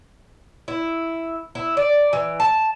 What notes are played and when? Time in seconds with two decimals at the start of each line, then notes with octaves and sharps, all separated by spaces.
0.68 E4
1.55 E4
1.77 D5
2.13 E3
2.40 A5